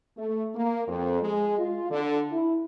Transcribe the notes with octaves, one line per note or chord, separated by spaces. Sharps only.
A3
A#3
F2
G#3
F4
D3
E4